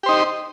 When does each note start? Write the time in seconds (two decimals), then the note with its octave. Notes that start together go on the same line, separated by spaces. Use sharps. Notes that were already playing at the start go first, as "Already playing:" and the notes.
0.03 G4
0.06 C5
0.09 D#4